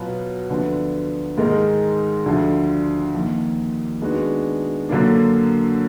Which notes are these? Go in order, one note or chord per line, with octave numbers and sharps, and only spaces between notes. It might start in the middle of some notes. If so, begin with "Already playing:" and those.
Already playing: B2 F#3 B3 F4
D2 D3 F3 B3
G#2 D#3 G#3 D#4 A#4
D2 D3 F3
F2 D#3 A#3
D#3 G#3 B3 D4 F#4
F#2 D3 F#3 A#3 D4